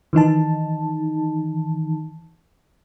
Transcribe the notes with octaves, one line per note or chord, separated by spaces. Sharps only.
D#3 E3 D#4 A5